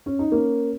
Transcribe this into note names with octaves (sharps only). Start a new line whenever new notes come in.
C#4
D#4
A#3 C#4